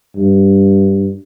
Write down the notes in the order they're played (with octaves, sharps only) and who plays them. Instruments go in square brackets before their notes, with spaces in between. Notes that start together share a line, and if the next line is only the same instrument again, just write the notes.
[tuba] G2